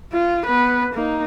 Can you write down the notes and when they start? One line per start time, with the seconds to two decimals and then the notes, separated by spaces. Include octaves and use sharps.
0.13 F4
0.46 B3 B4
0.94 A#3 D#4